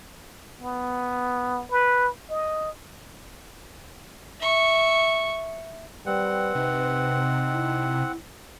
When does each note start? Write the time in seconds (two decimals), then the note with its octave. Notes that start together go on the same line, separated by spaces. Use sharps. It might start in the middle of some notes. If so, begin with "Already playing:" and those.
0.62 B3
1.71 B4
2.30 D#5
4.40 E5 C#6
6.06 G3 C4 B4 F#5
6.55 C3 D#4
7.53 E4